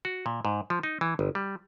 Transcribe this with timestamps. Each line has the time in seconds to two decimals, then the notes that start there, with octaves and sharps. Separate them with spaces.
0.05 F#4
0.26 A#2
0.45 G#2
0.70 F3
0.83 D#4
1.01 E3
1.19 G1
1.35 G3